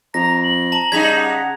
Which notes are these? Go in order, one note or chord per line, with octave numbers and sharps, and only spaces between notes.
F2 A#5 A#6
F#7
A5 A#5
C#3 G3 D#4 G#6 B6 F7
F#5